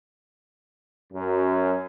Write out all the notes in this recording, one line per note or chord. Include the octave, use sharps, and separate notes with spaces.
F#2